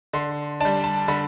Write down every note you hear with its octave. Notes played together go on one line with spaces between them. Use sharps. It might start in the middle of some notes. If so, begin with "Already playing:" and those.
D3 C6
G3 D4 A5
A5
D3 B5